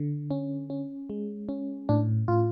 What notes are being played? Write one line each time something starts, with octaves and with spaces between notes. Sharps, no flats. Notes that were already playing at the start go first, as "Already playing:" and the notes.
Already playing: D3
C#4
C#4
G#3
C#4
A2 D4
A2 F4